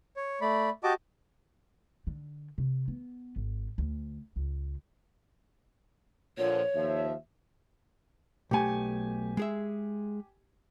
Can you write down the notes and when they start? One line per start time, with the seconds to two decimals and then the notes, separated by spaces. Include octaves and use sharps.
0.16 C#5
0.41 A3 D5 B5
0.84 F#4 G4 D#5 A5 D6
2.07 D3
2.58 C3
2.88 B3
3.36 G#1
3.78 D2
4.36 C#2
6.38 A#2 D3 F3 C#5
6.74 D#2 F3 E5
8.51 B1 A3 G4 G#5
9.37 G#3 G#4 E5